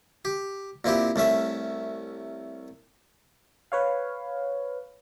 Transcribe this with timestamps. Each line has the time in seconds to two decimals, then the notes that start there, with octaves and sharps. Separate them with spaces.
0.25 G4
0.84 A#2 C4 E4 G4
1.16 C2 A3 C#4 E5
3.72 B4 C#5 F5